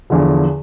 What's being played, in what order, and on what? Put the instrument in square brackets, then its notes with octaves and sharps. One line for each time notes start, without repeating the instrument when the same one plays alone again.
[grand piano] E2 D3 F3